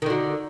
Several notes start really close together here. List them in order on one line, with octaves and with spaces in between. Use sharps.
D#3 D3 F#4